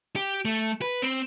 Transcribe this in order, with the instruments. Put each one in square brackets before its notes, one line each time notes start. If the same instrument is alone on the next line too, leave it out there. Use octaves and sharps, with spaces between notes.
[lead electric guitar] G4
A3
B4
C4